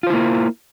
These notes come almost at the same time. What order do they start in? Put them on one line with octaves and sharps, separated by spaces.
F4 C5 E4 A#3